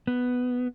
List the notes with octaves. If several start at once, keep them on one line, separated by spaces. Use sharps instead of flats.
B3